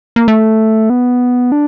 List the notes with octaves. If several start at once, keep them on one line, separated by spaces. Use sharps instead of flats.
A#3
A3
B3
D4